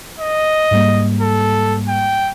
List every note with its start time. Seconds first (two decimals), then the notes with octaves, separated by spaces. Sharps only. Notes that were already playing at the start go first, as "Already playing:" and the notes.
0.19 D#5
0.71 G#2 G3 A#3
1.21 A4
1.88 G5